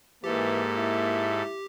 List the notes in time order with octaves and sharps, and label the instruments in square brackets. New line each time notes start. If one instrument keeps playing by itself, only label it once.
[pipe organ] G#2 A4 [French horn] E3 [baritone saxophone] A#3 [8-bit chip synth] G4
[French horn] E4